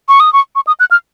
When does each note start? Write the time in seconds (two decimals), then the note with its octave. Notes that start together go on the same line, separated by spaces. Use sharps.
0.08 C#6
0.20 D#6
0.33 C#6
0.55 C#6
0.67 D#6
0.80 F#6
0.91 F6